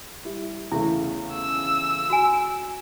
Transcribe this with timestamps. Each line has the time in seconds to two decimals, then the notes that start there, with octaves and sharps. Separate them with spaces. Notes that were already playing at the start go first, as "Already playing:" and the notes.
0.25 G3 E4 G4
0.72 E2 C#3 A3 E4
1.34 E6
2.10 F#4 G#5